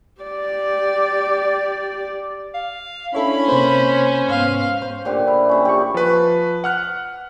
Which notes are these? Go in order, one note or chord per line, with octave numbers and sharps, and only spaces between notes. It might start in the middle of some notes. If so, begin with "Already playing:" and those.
G4 D5
F5
C#4 D4 E4 A4 C#5 B5
C3 A#3 C5
G#2 B3 F5
C5
A#2 D3 G4
E4
C#4 E4 G#4
G4 D5 C#6
F3 B4
F#5 F6 F#6